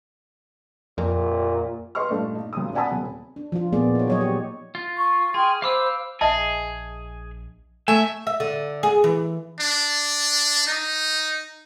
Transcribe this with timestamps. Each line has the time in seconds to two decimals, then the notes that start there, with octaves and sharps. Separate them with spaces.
0.98 F2 A#2
1.95 B4 D#5 C6 C#6 F6
2.09 G2 A#2 A3 D5
2.35 D#4
2.53 G#1 D#2 C#3 C#4 D#6
2.74 D5 F#5 G#5 A5 B5 D#6
2.91 D#1 C4
3.36 D4
3.52 F3 F4
3.73 A#2 A#3 B3 G#4 D5
3.95 D#4 C#5
4.08 F#3 C#5 D#5
4.21 G4
4.75 F4
4.96 C#6
5.34 G#4 G5 C6 F6
5.62 C5 F5 B5 D6 E6
6.21 A#1 G#4 D#5 E5 A5
7.88 A3 E5 G#5 E7
8.27 E5
8.40 D3
8.83 G#4
9.04 E3
9.60 D4
10.67 D#4